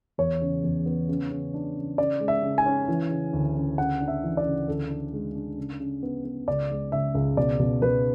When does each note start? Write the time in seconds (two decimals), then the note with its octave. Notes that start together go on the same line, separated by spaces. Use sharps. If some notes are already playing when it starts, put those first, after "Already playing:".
0.18 E2 C#5
0.41 C#3
0.64 E2
0.86 B3
1.09 C#3
1.31 C#3
1.54 D4
1.76 C#3
1.98 C#3 D5
2.20 G#3
2.28 E5
2.43 C#3
2.58 G#5
2.66 C#4
2.88 E3
3.10 C#3
3.33 D2
3.56 C#3
3.78 C#3 F#5
4.01 D4
4.08 E5
4.23 E3
4.37 D5
4.45 C#3
4.68 D2 A4
4.90 D4
5.13 G#3
5.35 D4
5.57 C#3
5.80 C#3
6.03 B3
6.25 B3
6.48 C#2 D5
6.70 G#3
6.92 C#2 E5
7.15 C#2
7.37 B2 D5
7.59 B2
7.82 B2 B4